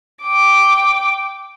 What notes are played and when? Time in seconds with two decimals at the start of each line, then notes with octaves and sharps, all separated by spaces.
0.22 G5 D6